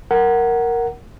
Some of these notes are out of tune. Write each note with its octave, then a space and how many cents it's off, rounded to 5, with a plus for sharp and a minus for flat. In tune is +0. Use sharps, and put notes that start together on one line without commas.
A#4 +0 F#5 +10